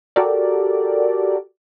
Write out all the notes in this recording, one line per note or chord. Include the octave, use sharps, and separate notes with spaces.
F#4 G4 A4 A#4 D5